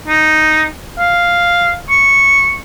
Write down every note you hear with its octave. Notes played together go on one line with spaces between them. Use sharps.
D#4
F5
C#6